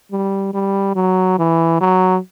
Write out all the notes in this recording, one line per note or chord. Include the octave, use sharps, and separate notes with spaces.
G3
G3
F#3
E3
F#3